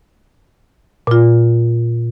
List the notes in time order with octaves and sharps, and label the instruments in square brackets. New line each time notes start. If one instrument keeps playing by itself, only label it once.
[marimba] A#2 F4